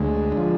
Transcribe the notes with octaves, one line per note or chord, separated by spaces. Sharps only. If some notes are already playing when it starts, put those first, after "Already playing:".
Already playing: D2 G#3
D3
F3